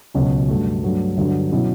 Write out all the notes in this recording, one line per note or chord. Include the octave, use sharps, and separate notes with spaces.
C#2 B2 F#3 C#4
G2 F#3 A3
G2 F#3 A3
G2 D3 F#3
B2 F#3 C#4 E4